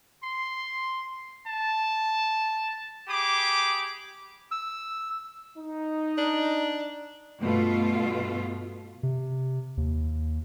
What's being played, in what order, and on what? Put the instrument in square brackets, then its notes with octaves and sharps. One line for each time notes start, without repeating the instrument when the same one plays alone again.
[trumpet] C6
A5
[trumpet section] G4 G#4 B5 D6
[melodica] E6
[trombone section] D#4
[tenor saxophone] D4
[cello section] G2 B2 A3 F4
[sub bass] C3
D#2